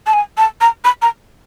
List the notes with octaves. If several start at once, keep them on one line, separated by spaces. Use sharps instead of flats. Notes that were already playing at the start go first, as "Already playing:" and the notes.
A5
G#5
A5
A#5
B5
A#5